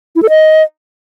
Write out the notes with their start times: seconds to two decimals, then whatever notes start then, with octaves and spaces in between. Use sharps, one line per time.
0.16 E4
0.23 A4
0.29 D#5